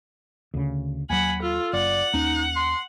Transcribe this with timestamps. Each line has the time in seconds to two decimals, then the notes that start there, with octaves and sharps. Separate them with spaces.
0.54 D2 C#3
1.10 D#2 F#3 F#5 G#5 B5
1.42 F4 A4
1.73 F#1 D5 F#5
2.13 D#2 C#4 D#4
2.56 C6